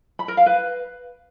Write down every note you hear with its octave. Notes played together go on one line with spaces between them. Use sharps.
B5
A#4
F5
B4